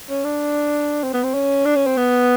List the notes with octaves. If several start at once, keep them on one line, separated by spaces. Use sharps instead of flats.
C#4
D4
C4
B3
C4
C#4
D4
C#4
C4
B3